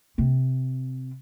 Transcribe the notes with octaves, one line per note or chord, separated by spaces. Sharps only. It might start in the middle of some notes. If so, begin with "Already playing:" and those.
C3 C4